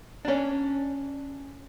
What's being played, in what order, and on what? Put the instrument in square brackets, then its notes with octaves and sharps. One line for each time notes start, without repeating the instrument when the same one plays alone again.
[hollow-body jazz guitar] C#4 D4